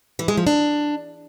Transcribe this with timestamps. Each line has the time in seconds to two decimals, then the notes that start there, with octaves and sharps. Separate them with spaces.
0.19 E3
0.28 G#3
0.37 F3
0.47 D4